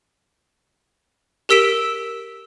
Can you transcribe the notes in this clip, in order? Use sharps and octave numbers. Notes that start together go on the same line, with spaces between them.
G4 A#4 E6 B6 D7 E7